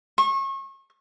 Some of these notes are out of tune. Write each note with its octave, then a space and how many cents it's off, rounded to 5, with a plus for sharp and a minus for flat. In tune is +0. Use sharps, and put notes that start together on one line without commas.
C#6 -35